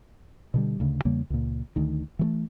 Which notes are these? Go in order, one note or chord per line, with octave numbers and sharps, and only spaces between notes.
B2 D3 G3
D2 C#3
E2 C#3 G3 A#3
C#2 A#2
D2 D#3
E3 F#3 A3